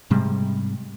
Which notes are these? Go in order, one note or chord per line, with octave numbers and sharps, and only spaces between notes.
G#2 C3 G3 G#3